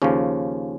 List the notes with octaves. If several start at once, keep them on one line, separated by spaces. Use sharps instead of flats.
D#2 C#3 F3 C#4